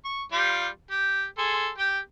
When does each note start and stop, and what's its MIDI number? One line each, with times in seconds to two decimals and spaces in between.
0.05 0.23 85
0.32 0.67 55
0.32 0.67 65
0.32 0.67 67
0.91 1.25 67
1.38 1.70 68
1.38 1.70 69
1.38 1.70 84
1.78 1.99 67
1.78 1.99 79